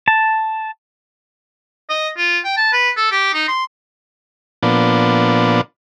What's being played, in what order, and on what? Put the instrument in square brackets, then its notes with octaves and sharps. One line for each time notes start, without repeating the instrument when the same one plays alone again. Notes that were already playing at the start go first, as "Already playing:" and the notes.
[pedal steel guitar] A5
[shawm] D#5
F4
G5
A5
B4
A4
G4
D#4
C6
[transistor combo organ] A#2 F3 B3 D4